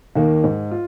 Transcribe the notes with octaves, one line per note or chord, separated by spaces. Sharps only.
D#2 D#3 A#3
G#2
F4